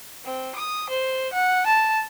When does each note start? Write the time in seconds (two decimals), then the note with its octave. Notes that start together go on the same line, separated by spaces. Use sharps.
0.25 C4
0.55 D#6
0.89 C5
1.33 F#5
1.66 A5